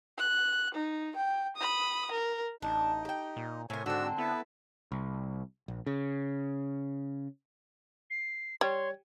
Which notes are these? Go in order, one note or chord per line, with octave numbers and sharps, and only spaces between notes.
F#6
D#4
G5
B5 D#6
A#4
A1 D4 D#4
G4 G5
A#2
A2 C3 A#4 C#5 G#5
G#2 D3 C4 D4 F#4 E6
B3 E4 A4 B4
C2
A#1
C#3
C7
G3 C#5 C6 G#6